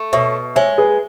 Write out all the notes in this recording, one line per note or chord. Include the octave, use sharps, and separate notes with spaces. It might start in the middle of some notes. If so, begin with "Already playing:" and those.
Already playing: A3
B2 C#5 E5
G#3 C#5 E5
G#4 B4